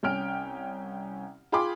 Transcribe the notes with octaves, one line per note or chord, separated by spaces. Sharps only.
C2 C#4 G5 F6 D7
F4 G#4 G5 B5 C6 D6